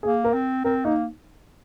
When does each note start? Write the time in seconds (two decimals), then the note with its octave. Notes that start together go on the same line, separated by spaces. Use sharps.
0.03 A#3 G#4
0.24 A#4
0.34 C4
0.64 C4 A#4
0.85 A#3 D#4